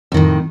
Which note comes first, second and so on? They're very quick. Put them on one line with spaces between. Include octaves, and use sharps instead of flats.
F2 D#3 A2